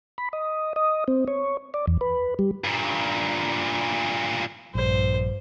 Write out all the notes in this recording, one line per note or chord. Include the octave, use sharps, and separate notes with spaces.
B5
D#5
D#5
C4
C#5
D5
E2
B4
G3
G2 A#2
A#1 G2 C5